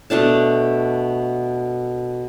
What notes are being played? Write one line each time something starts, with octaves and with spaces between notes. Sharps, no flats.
B2 A3 D4 A5